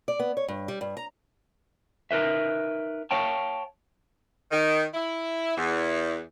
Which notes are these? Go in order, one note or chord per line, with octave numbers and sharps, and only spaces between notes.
D5
B3
C#5
G2
G3
G2
A#5
D#4 A#4 B4 E5
C#5 F5 G5 A5
D#3
E4
E2